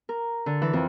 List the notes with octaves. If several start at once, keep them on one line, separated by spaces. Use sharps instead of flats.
A#4
D3
E3
F2